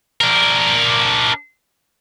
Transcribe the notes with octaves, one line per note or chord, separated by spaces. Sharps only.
D4 A#4